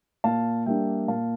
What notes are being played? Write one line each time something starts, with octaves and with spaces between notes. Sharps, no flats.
A#2 F5 A5
G3 A#3 D4 E5 G5
A#2 F5 A5